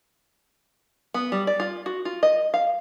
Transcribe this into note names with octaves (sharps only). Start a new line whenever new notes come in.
B3
G3
D5
F4
F#4
F4
D#5
F5